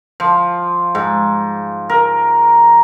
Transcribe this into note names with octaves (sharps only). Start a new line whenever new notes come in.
F3
G#2
A#4